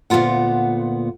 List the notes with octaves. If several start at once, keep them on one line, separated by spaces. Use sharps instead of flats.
D2 A#2 F3 B3 F4 F#5